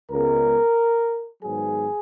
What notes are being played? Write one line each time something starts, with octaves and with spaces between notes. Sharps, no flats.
C#2 C#3 G#3 B3 A#4
G#2 D#3 F#3 B3 G#4